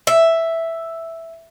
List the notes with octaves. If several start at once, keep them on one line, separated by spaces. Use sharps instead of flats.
E5